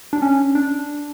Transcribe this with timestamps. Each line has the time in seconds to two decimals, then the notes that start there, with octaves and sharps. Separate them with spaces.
0.13 D4
0.22 C#4
0.55 D4